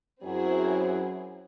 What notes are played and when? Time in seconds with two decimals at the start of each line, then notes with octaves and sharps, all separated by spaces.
0.23 F#2 F#3 C4 E4 G#4 C5